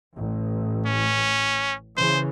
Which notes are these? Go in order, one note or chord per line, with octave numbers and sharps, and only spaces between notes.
A1
C#4
C#3 E3 C5